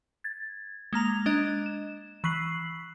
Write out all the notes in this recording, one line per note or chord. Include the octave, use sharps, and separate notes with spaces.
G#6 A6
G#3 A#3 A#5 F7
G#3 D4 D#5 F#6
E7
E3 C#6 F#6 B6 C7 F#7